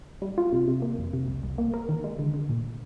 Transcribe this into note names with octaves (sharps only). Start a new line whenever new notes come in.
G3
F4
C3
C3
A#3
F2
C3
C2
C2
A#3
A#4
D#3
G#3
D3
D3
A#2